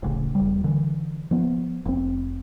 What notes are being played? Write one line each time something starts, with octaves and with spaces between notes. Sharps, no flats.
D1 A1 C#3
E1 G3
D3 E3
F3 B3
F1 C4